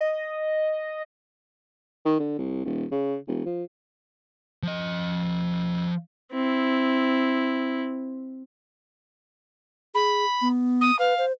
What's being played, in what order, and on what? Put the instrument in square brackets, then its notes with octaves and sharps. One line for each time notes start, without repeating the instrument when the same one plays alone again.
[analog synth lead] D#5
[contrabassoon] D#3
D3
C2
D#1
C#3
E1
F3
[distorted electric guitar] F3 D#5
[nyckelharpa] C4 E4
[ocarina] G#4 [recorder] B5
[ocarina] B3
[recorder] D#6
[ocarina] B4 [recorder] F5
[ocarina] C5